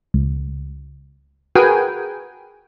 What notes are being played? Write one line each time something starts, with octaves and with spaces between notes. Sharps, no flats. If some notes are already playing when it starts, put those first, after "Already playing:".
C#2
F#4 G#4 A#4 B4 G5 G#5